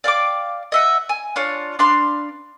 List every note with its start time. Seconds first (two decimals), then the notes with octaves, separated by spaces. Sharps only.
0.04 D5 F5 G5 D6
0.72 D#5 E5 F#5
1.09 G#5
1.36 D4 F4 C#5
1.79 D4 B4 F5 C6